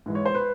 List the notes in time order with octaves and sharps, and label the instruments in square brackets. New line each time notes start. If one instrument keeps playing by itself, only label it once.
[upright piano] G#2 E3 G#3
C#5
C5
B4